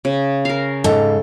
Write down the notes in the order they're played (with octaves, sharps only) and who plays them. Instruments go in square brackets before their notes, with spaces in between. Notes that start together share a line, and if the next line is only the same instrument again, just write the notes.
[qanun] C#3
A#4 F5
[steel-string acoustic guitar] G#2 [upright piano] A4